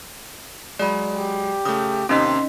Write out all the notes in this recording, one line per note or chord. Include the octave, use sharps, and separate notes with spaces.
F#3 G#3 D5 B5
G4
C#3 A3 D#6
D#2 C3 C#4 D#4 D#5 C6 B6